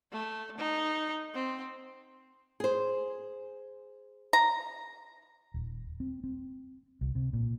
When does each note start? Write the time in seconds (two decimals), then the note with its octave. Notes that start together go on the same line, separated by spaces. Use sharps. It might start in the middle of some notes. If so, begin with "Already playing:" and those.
0.12 A3
0.58 D#4
1.34 C4
2.60 G#4 C5
4.33 A#5
5.54 D#1
6.00 C4
6.24 C4
7.01 C2
7.15 C3
7.33 A#2